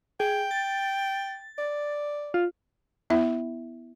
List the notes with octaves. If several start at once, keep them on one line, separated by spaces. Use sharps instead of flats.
G#4 G5
A6
D5
F4
B3 E4 E5